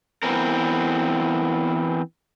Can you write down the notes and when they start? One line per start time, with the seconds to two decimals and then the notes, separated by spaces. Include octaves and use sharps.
0.23 E3 B3 C4 A#4